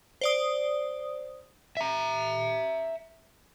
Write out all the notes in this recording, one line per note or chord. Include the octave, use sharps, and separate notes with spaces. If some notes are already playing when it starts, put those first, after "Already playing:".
C5 D5 D#6
E5 A#5